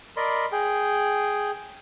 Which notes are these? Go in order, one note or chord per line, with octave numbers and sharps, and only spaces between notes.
A#4 D5 D#5 B5 C6
G#4 G5